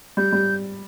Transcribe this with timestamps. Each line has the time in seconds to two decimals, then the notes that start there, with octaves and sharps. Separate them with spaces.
0.17 G3 G6
0.33 G3